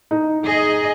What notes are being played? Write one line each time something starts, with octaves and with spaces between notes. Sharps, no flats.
D#4
G#4 D#5